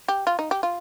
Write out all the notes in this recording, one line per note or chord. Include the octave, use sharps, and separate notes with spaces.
G4
F4
D#4
G4
F4